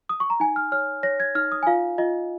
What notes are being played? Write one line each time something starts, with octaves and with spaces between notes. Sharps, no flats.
D#6
C#6
A#5
D#4 G#5
F6
C#5 F6
C#5 A#6
G#6
D#4 F6
D#6
G#5
F4 F5
F4 D#5